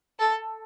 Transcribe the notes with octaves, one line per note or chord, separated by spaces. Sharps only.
A4